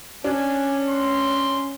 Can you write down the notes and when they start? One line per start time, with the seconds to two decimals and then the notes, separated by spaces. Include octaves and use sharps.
0.24 C#4 D4 G#5
0.88 C6